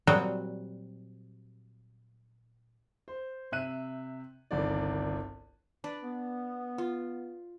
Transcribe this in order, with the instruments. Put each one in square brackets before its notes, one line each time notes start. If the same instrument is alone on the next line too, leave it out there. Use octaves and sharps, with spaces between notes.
[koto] A#2 F#3 G3 C4 F#4 D#5
[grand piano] C5
C3 E5 F#6 D#7
G1 C2 D#3 D5
[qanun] D4 B4 D5
[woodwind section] B3
[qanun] F4